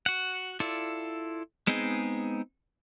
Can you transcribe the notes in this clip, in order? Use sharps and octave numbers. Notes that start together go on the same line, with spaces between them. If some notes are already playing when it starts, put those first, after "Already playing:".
F#4 F#5
E4 F4 A4 D5
G#3 B3 C4 D#4 G#4